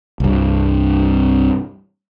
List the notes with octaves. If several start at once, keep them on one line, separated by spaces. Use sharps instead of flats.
C2 G2